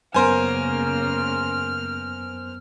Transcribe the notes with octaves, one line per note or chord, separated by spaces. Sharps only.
F#2 C#3 A#3 B3 A#4 C5 G#5 F6